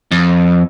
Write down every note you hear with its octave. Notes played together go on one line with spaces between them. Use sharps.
F2